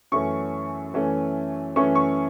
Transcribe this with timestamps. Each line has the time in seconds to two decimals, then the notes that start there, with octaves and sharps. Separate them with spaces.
0.12 F#2 E3 A3 C#4 C#6
0.94 F#2 E3 A3 C#4
1.76 F#2 E3 A3 C#4 C#6
1.95 C#6